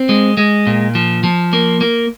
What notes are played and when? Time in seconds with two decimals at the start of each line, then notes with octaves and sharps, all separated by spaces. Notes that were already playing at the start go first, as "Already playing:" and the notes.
Already playing: C4
0.09 G#3
0.37 G#3
0.67 A#2
0.95 F3
1.24 F3
1.53 A#3
1.81 A#3